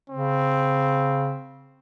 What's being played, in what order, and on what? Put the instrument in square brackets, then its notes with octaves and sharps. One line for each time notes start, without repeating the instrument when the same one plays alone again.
[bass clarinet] C#3 [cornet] C4